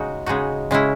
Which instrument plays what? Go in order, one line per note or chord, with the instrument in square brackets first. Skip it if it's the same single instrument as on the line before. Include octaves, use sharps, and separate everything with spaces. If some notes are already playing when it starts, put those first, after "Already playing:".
Already playing: [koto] C#3 G#3 D#4 F#4
C#3 G#3 D#4 F#4
C#3 G#3 C#4 E4